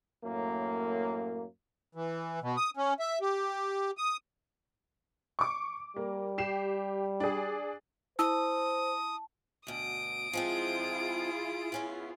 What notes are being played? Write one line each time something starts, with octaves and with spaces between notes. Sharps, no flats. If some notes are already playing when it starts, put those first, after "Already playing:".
F#2 A2 A#3
E3
B2
D#6
C#4
E5
G4
D#6
C#6 D6
G3 A#3
G4 C7 E7
D4 G#4
E4 C5 A5 D#6 E6
D2 B2 D#6 D7
F3 G#3 C4 E4 F4 G#4
B3 C#4 B4